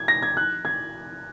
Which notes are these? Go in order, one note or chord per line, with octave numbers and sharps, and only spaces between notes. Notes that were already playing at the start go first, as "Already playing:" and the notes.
Already playing: G#6
A#6
G#6
F#6
G#6